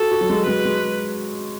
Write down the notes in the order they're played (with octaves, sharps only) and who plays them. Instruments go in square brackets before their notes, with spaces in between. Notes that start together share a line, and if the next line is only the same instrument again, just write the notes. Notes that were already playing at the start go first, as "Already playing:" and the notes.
Already playing: [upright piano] F#4 [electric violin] A4
[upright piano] F#4
F#3
G#3
[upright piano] G#3 [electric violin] B4
[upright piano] G#3